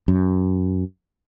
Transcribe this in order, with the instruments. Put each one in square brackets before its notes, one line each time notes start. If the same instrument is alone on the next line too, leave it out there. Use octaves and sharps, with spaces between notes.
[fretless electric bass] F#2